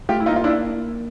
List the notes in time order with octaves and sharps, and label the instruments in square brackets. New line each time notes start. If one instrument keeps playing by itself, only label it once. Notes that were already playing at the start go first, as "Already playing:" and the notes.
[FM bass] A3 [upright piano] F4 G4
[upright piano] E4
[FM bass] A#3 [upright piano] D#4 F4
[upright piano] F4
D4 E4